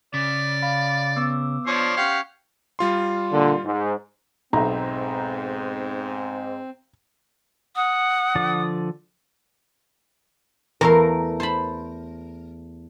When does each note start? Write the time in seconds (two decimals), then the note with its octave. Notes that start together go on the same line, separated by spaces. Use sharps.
0.14 C#3 D5 D6 B6
0.62 F5 B5
1.16 B3 D6 E6
1.66 F3 D4 C5 C#5
1.97 C#4 G4 F5 F#5 C#6 G#6
2.79 G3 F4 C6
3.31 A#2 D3
3.65 G#2
4.53 B1 G#2 C4 E5 A#5
7.76 F#5 D#6
8.35 D3 F3 D5
10.81 E2 A3 A#4 F5
11.40 C5 A5 B5